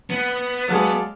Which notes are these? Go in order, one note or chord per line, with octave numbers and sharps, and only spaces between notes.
B3
F#3 G#3 D5 F5 A5